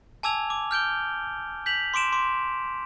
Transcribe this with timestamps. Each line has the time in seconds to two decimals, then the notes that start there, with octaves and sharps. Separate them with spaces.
0.23 G#5 A5 D6 E6 G#6 F7
0.50 D6
0.71 F6 G6 D7 G7
1.66 G6 B6 F7 F#7
1.94 C6 D6 D7 E7
2.12 C6 D6